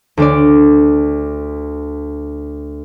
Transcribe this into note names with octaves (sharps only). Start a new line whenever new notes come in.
D2 D4 D5